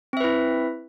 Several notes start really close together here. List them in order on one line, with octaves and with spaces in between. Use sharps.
C4 E5 B4 E4